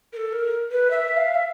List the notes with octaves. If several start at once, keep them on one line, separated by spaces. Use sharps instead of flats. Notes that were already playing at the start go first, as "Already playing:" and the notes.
A#4
A4
A#4
B4
E5
F5
E5